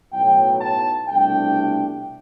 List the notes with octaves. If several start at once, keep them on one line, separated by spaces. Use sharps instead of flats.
B1 A2 F#3 G5
A5
C2 B2 A3 D4 G5